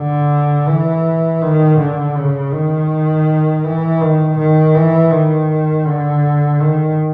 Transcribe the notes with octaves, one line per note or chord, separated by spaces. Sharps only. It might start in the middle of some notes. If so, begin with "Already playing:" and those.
Already playing: D3
E3
D#3
D3
C#3
D#3
E3
D#3
D#3
E3
D#3
D3
D#3